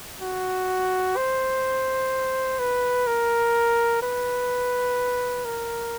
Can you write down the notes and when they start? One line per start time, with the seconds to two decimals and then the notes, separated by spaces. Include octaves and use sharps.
0.21 F#4
1.16 C5
2.59 B4
3.07 A#4
4.02 B4
5.44 A#4